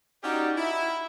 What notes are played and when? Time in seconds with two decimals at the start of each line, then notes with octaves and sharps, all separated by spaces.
0.23 C#4 D#4 F#4 G4 D5
0.56 E4